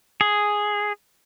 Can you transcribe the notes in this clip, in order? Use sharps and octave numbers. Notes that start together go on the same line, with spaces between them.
G#4